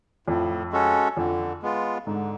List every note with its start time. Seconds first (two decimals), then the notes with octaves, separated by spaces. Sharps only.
0.27 F2 A2
0.72 G#3 C#4 F#4 A4
1.17 F2 D3
1.62 G#3 B3 F4
2.07 G#2 D3